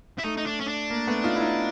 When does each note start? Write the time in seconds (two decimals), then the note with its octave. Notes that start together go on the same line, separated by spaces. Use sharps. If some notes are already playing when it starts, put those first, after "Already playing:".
0.19 E4
0.24 A3 D#4
0.37 D#4
0.47 D4
0.61 C#4
0.69 D4
0.90 A#3
1.07 A3 B3
1.23 D#4 F4
1.36 E4
1.40 D#4 F4